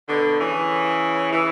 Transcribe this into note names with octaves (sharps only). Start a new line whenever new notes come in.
B2 D3
C#3 E3
C#3 E3